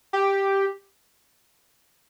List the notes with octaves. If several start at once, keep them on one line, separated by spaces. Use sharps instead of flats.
G4